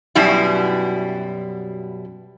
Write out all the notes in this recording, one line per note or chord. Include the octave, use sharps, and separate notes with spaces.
F#2 B2 G3 E4